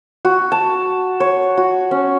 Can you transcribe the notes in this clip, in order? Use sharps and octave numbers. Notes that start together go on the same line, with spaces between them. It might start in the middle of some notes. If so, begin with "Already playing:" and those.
F#4
A5
C#5
F#4
C#4